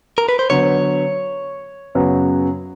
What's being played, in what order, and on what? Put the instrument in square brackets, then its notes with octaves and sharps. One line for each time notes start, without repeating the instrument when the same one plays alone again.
[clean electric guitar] A#4
B4
C5
[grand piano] D3 F#3 B3 [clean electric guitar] C#5
[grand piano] F#2 C#3 F#3 B3